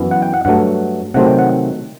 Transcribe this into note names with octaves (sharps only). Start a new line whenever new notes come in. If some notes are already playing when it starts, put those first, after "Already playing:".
Already playing: F#2 E3 B3 E4
F#5
G5
F#5
G2 F#3 A3 F#5
C3 D#3 F#3 A3 C4 F#5
G5
F#5